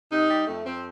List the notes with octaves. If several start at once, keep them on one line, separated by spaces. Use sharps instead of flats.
C3 D#4
G3
F2 A3
F2 C4